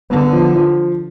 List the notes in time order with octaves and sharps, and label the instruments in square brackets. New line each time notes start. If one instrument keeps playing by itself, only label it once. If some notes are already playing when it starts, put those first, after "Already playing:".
[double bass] D3 [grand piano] B3
[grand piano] F3
F3